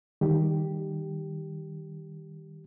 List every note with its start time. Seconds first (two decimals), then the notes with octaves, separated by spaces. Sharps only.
0.21 D#3 G3 G4